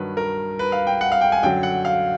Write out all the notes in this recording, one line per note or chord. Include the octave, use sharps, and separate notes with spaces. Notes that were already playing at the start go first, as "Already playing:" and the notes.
Already playing: G2 D#3 F#3 B4
A#4
B4
F5
G5
F#5
F5
G5
G#5
F#2 D3 F#3 G5
F#5
F5